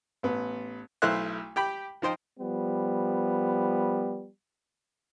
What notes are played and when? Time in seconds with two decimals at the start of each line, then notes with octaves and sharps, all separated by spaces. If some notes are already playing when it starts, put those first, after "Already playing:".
0.23 A1 B3
1.02 B1 A3 E4 C5 F5 F#6
1.56 G4 G5 B5
2.02 F3 D#4 C5 G5
2.40 F3 G3 B3